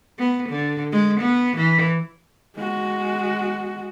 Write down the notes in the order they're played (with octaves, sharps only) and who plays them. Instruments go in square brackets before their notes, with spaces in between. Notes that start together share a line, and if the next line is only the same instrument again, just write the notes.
[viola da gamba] B3
D3
G#3
B3
E3
[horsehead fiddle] G#3 F#4